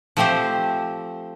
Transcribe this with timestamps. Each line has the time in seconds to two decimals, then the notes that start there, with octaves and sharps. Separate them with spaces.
0.17 F3 A3 C4 G4 C5